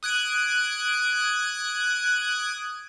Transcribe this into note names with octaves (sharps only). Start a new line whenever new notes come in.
D#6 F#6 G#6 D7